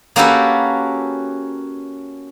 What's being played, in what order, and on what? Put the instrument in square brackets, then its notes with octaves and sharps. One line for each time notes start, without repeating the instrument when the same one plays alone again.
[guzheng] A#3 C#4 F#4 G4 A4 B4